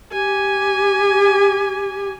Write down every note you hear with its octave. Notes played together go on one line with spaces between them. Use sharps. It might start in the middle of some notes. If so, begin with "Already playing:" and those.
G4 G#5